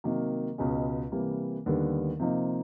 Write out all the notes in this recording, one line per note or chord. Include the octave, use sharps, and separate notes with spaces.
C3 D#3 F#3 A#3
C#2 B2 G#3 C#4
C3 E3 G3 A#3
D#2 D3 G3 B3
C3 F3 A#3 D#4